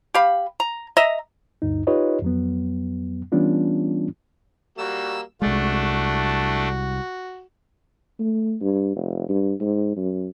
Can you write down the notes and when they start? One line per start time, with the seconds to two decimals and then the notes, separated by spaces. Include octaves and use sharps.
0.14 G4 F5 B5
0.60 A#5
0.97 D#5 E5 A#5
1.62 D2 G2 D#4
1.87 D#4 F4 G4 B4 C#5 D#5
2.22 F2 F#3 B3
3.32 E3 G3 B3 C#4 D4 F4
4.78 G3 A#3 F#4 E6
5.42 C2 G#3 A3 D4 F#4
8.20 A3
8.61 G2
8.96 F1
9.29 G2
9.61 G#2
9.97 F#2